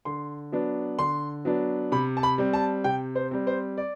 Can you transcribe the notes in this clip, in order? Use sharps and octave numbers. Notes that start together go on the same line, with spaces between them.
D3 C6
F#3 B3 D4
D3 C6
F#3 B3 D4
C3 B5
A5
B5
G3 C4
A5
C3 G5
C5
G3 C4
C5
D5